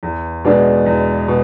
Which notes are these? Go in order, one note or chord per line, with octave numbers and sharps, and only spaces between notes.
E2
B2 G#3 D4
E2
B2 G#3